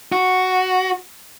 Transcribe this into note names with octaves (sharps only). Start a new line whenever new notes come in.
F#4